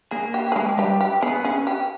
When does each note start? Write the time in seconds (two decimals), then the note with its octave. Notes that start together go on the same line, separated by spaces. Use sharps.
0.11 A#3 G#4
0.34 G4
0.52 G#4
0.56 G#3 G4
0.78 G3 G4
1.01 G4
1.22 B3 G#4
1.45 C#4 G#4
1.67 G4